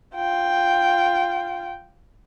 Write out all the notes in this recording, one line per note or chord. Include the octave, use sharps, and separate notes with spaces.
F4 G5